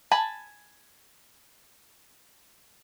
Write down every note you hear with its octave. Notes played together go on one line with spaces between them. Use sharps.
G#5 A5 B5